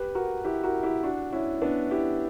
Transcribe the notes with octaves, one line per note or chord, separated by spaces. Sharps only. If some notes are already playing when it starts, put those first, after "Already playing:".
Already playing: G4 B4
F#4 A#4
E4 G4
F#4 A#4
E4 G4
D4 F#4
C#4 E4
B3 D4
E4 G4